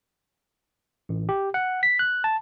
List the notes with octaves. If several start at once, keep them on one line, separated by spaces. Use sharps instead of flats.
A1
G4
F#5
B6
F#6
A5